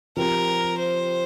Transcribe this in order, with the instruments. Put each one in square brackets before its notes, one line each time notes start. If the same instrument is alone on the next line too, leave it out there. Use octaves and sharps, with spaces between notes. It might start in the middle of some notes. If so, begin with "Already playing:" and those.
[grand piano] F3 C4 G4 [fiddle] A#4
[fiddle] C5